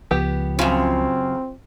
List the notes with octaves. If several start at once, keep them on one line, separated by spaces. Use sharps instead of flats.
C#2 F3 B3 G4 G5
F#2 C#3 C4 F4